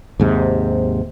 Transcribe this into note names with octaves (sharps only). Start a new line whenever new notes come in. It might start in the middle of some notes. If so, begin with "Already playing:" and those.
D#2 G#2 C3